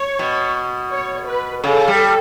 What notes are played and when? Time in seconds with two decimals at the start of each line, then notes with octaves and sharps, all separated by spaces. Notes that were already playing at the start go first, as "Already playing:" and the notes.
Already playing: C#5
0.19 B2
0.92 C#5
1.28 B4
1.64 C#3 A4
1.88 G3